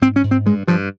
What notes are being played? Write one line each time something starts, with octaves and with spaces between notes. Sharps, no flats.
G#2 C4
C#4
G#2
C4
G2 G#3
G2 F3